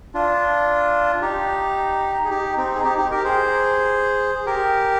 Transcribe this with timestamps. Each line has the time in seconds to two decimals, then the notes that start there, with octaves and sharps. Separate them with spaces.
0.14 D4 F4
1.22 D#4 G4
2.25 G#4
2.30 D#4 G4
2.57 C4 D#4
2.75 G#4
2.85 D#4 G4
2.98 D#4 G4
3.11 G4 A#4
3.24 G#4 C5
4.35 G#4
4.46 G4 A#4